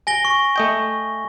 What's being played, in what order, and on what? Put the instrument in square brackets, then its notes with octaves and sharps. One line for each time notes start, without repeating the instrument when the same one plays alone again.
[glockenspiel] G#5 A#6 G7
C#6
[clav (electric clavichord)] A3 D#5 G5